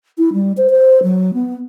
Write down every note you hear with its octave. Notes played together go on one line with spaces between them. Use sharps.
E4
G3
C5
C5
F#3
B3